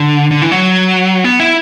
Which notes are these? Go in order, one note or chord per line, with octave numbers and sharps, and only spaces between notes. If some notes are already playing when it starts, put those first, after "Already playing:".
Already playing: D3
D3
E3
F#3
B3
E4